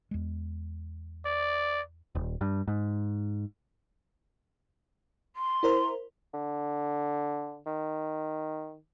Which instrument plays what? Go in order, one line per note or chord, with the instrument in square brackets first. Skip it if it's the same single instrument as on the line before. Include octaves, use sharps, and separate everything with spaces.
[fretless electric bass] E2 G#3
[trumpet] D5
[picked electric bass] D#1
G2
G#2
[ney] C6
[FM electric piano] E4 A#4 C5
[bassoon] D3
D#3